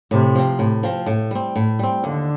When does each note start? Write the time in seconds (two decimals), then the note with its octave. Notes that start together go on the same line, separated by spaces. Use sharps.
0.11 A2 C3
0.35 F3 C4
0.59 A2
0.83 F3 C4
1.06 A2
1.31 G3 C4
1.56 A2
1.79 G3 C4
2.04 D#2 D3